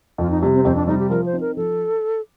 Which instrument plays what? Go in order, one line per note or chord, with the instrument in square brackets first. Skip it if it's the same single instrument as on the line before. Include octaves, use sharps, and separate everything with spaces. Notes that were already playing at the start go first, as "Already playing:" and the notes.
[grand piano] F2 [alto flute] F4
[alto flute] D#4
[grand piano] C3 G3
[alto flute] C4
[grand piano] F2 [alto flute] C4
[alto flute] D4
[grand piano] C3 G3 [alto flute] D#4
[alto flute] G4
[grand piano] F3 [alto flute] A#4
[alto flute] C5
[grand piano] C4 D#4
[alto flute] A#4
[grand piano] F3 [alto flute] A4